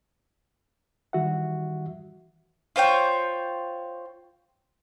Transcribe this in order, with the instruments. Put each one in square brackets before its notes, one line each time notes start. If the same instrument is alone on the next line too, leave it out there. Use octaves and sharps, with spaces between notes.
[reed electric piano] D#3 E3 G3 F#4 E5 F#5
[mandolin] F4 C5 C#5 G5